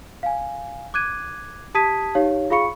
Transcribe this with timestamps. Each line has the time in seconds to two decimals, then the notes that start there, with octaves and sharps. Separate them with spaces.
0.23 F5 G#5
0.94 D6 F#6 G#6 D#7
1.74 G4 A5 D#6 G#6 B6 D#7
2.15 D#4 G4 C#5 F5
2.50 F4 G#4 F5 B5 C#6 C#7